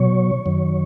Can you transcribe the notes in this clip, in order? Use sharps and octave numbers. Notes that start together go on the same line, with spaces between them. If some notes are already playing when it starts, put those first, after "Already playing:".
Already playing: B2 F#3 C#5
F#2 D#3 F#3